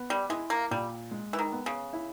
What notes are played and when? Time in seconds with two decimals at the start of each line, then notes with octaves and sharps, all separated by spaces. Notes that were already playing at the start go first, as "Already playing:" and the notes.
Already playing: B3
0.10 G3
0.30 G#3 E4
0.50 A#3
0.71 A#2 G3
1.11 G#3
1.33 E3
1.39 D#3
1.52 B3
1.66 C#3
1.93 E4